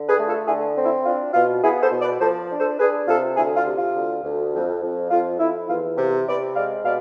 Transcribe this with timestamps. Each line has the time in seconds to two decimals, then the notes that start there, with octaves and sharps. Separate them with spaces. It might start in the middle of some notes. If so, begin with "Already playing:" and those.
Already playing: D3
0.08 G#4 B4
0.17 A3
0.27 F4 A4
0.46 D3 E4 G#4
0.75 C4
0.85 E4
1.04 D4 F4
1.33 B2 F4
1.63 B3 E4 G#4
1.81 A4 C5
1.91 B2
2.01 B4 D5
2.20 F3 A4 C5
2.50 D4
2.59 A4 C5
2.79 D4 G#4 B4
3.07 C3 F4 A4
3.36 D2 E4 G#4
3.56 F4
3.66 C3
3.75 F4
3.94 D2
4.23 D2
4.53 F2
4.82 F2
5.10 F2 F4
5.39 F2 E4
5.68 E2 F4
5.98 C3
6.26 C3 B4 D5
6.55 G#3 D5 F5
6.84 B2 D5 F5